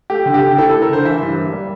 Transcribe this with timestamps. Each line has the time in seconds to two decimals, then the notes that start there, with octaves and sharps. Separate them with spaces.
0.10 A3 G4
0.26 D3
0.34 G4
0.42 D3
0.58 E4 A4
0.69 A4
0.74 A3
0.82 A#4
0.89 D3 C5
1.05 E3 E5
1.22 G2
1.38 A#3
1.53 G3